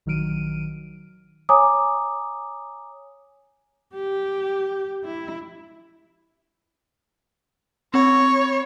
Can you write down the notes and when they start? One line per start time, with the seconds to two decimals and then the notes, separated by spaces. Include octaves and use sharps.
0.06 A#1 D#3 F#3 F6 D7 D#7
1.49 C#5 G#5 A#5 D6 D#6
3.94 G4
5.04 E4
7.94 C4 C#5 F#5 B5